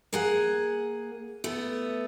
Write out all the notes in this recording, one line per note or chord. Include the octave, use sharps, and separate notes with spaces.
A#3 G#4 F#5
A3 B3